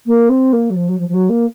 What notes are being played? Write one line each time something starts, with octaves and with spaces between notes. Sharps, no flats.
A#3
C4
A#3
F#3
F3
F#3
F3
F3
F#3
A#3